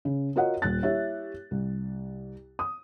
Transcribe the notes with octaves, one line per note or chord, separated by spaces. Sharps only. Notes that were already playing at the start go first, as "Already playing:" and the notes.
C#3
F4 F#4 A#4 C#5 D#5 F#5
D#1 F#6 A6
E4 G4 C#5 E5
C2
D#6